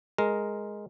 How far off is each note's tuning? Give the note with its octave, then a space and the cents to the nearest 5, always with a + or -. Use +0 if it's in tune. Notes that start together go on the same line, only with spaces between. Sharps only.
G#3 +0 A#4 +0